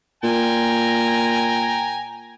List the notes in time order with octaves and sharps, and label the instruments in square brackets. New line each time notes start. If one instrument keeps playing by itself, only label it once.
[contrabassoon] A#2 [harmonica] G5 G#5 A#5